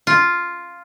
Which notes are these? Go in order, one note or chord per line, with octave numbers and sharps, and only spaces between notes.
F4